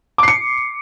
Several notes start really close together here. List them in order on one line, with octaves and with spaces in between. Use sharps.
D6 C7 C#7